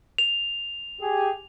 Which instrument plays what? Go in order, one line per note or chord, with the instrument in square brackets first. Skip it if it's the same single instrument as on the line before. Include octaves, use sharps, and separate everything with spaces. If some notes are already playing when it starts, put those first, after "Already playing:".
[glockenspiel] F7
[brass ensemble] G4 G#4